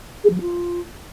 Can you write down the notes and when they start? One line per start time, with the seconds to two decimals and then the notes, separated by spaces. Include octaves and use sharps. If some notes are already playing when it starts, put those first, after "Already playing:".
0.24 G#4
0.29 F3
0.35 F#3
0.41 F4